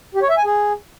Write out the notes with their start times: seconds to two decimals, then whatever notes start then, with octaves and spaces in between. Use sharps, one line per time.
0.15 G4
0.22 C#5
0.30 E5
0.37 G#5
0.45 G#4